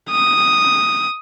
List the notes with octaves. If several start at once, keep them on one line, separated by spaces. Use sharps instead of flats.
D#6